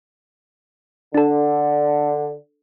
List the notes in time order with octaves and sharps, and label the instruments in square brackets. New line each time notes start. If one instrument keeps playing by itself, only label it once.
[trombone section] D3 [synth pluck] D4 A4